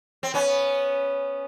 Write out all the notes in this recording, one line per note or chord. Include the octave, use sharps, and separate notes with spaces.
C4
B3 C#4